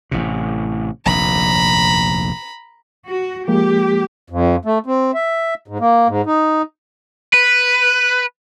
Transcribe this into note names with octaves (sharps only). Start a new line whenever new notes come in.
A1 A2 C3
F1 A#1 D#2 A#5 B5
F#4
F3 G#3 A#3 G4
F2
A3
C4
E5
G#2
A#3
G#2
D#4
B4